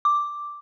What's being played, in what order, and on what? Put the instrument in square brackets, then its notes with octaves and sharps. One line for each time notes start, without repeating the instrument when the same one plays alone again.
[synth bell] D6